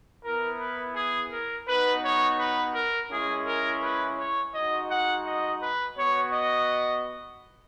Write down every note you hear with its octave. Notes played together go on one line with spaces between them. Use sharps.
B3 E4 A#4
B4
G#4
A#4
B3 D#4 F#4 B4
C#5
B4
A#4
G#3 C#4 E4 G#4
A#4
B4
C#5
G#3 D#4 F#4 D#5
F#5
D#5
B4
B3 F#4 C#5
D#5